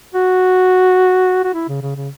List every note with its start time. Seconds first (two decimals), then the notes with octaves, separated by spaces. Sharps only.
0.14 F#4
1.44 F#4
1.54 E4
1.69 C#3
1.82 C#3
1.96 C#3